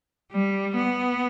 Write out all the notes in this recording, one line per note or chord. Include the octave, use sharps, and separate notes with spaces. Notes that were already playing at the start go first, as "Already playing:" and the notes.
G3
B3